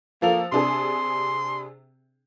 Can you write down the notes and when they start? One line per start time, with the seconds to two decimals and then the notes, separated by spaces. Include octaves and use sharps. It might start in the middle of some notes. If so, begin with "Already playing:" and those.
0.22 F3 A#3 A4 F7
0.52 C3 D4 G#4 C6